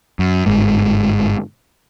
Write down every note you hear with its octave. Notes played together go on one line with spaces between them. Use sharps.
F#2
G1 G#2